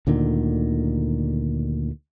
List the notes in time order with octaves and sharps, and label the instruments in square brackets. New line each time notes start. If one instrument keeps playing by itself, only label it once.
[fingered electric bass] D2 A#2 D3 D#3